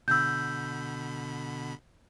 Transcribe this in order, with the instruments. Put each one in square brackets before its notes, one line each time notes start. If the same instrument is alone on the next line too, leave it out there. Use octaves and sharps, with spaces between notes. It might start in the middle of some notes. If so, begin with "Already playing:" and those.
[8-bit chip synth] B2 D3 B5 [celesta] E6 G6